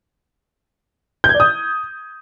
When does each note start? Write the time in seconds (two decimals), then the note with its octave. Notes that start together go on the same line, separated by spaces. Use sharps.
1.24 G6
1.29 G#6
1.35 D5
1.40 D#6